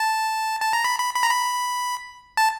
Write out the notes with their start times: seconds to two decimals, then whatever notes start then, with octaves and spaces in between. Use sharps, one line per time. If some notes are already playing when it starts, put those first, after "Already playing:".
Already playing: A5
0.61 A5
0.73 A#5
0.84 B5
0.99 B5
1.15 B5
1.23 A#5
1.31 B5
2.37 A5